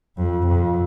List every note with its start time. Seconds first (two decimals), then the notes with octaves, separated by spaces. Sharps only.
0.17 F2
0.47 F2